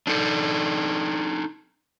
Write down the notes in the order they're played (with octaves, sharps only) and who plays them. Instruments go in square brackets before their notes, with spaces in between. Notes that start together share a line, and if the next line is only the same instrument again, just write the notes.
[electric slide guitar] D4 D#4 A4